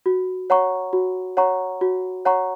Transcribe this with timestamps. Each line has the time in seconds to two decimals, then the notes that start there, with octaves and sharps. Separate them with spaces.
0.06 F#4
0.50 C#5 F#5 A#5 C#6
0.93 F#4
1.37 C#5 F#5 A#5 C#6
1.81 F#4
2.25 C#5 F#5 A#5 C#6